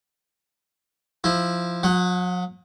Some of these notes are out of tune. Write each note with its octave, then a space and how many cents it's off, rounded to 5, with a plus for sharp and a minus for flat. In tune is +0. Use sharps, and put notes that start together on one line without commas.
F3 -5 E4 +0
F#3 -45 F#5 +0